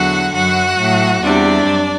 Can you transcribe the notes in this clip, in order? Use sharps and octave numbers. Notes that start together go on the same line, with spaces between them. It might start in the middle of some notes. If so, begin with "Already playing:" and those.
Already playing: E2 D3 F#3 F#4 F#5
F#2 F#3 F#4 F#5
A2 F#3
E2 C3 G3 D4 D5
F#2